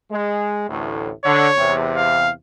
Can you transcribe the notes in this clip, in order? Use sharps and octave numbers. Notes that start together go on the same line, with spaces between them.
G#3
A1 D2 A2
D3 C#5
E2 C3
F5